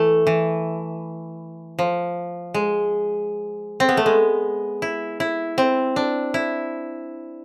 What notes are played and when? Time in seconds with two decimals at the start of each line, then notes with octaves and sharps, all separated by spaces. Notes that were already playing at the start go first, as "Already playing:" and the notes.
Already playing: E3 A3
0.27 E3
1.79 F3
2.54 G#3
3.80 C4
3.89 B3
3.97 A3
4.06 G#3
4.82 E4
5.20 E4
5.58 C4
5.96 D4
6.34 E4